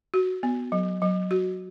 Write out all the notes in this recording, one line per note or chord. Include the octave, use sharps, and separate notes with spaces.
F#4
B3
F#3
F#3
F#4